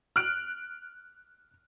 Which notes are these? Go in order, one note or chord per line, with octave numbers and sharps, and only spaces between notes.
F6 F#6 D7